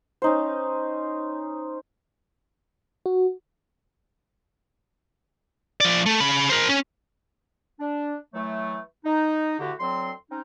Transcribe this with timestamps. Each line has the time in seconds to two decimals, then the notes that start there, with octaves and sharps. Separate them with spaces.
0.22 C#4 D#4 C5
3.06 F#4
5.81 F3 D5
6.06 A3
6.20 C#3 B5
6.49 A#4 C5
6.69 C#4
7.80 D4
8.34 E3 F#3 A3
9.05 D#4
9.59 A2 D3 F#4 G4
9.79 D2 F#3 C4 C6
10.30 C4 C#4 D#4